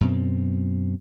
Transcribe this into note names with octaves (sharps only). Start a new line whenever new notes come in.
F#2 B2 C4